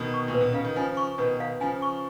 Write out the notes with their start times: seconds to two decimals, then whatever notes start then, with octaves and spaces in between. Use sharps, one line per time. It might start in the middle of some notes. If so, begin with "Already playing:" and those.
Already playing: B2 D#3
0.14 C#6
0.28 A#2
0.34 B4
0.41 B2
0.53 C#3 F5
0.65 D#3
0.76 C#3 F3 G#5
0.97 C#6
1.18 B2 D#3 B4
1.40 F5
1.60 C#3 F3 G#5
1.82 C#6